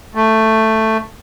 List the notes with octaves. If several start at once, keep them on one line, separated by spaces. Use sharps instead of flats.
A3